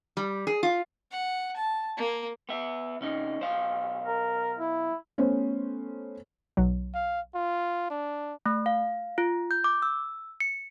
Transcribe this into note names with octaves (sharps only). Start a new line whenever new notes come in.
G3
G#4
F4
F#5
A5
A#3
B3 E5
C3 C#4 D#4
B1 C5 F5
A#4
E4
A3 B3 C#4 C5
B1 F#3
F5
F4
D4
A3
F5
F4
G6
D6
E6
C#7